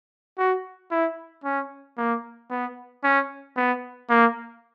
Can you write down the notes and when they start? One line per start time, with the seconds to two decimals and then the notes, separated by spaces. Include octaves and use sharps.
0.38 F#4
0.91 E4
1.44 C#4
1.98 A#3
2.50 B3
3.04 C#4
3.56 B3
4.10 A#3